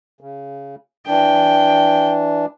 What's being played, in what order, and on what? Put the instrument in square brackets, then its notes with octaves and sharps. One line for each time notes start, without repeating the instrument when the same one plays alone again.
[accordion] C#3
[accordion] E3 D4 [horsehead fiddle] G5